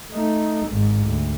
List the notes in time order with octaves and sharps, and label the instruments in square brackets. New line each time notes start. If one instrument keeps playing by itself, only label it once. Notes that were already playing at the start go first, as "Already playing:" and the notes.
[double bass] A3 D#4
G#1 G#2
D2